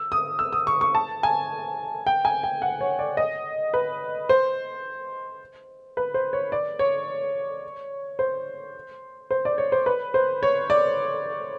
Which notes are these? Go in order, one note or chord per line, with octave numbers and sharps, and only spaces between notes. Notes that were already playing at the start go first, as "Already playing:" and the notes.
Already playing: E6
D#6
E6
D#6
C#6
C#6
A5
G#5
G5
G#5
G5
F#5
C#5
D5
D#5
B4
C5
B4
C5
C#5
D5
C#5
C5
C5
D5
C#5
C5
B4
C5
C#5
D5